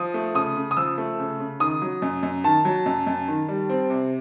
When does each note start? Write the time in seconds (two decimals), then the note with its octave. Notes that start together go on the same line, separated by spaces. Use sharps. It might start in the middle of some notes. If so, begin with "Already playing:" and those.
Already playing: F3 D#6
0.14 A3
0.35 C#3 D#6
0.56 C#3
0.71 D#6
0.77 F3 E6
0.98 A3
1.19 C#3
1.39 C#3
1.60 D#3 D#6
1.82 F#3
2.02 F#2
2.23 F#2
2.44 D#3 A5
2.65 F#3
2.86 F#2
3.07 F#2
3.28 D#3
3.48 G3
3.70 C4
3.90 C3